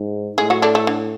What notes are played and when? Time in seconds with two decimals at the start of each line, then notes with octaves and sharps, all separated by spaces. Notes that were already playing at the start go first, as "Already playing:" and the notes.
Already playing: G#2
0.38 A2 G#3 G#4
0.50 F#3 F#4
0.62 D3 D4
0.75 A3
0.87 D3